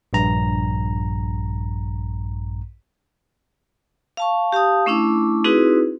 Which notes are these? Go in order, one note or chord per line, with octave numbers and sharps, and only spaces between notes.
A#1 G2 A#5
F5 A5 C#6
G4 F5 A5 D#6
A3 C#4 D4 E4 D6
C4 D#4 E4 F#4 G#4 B4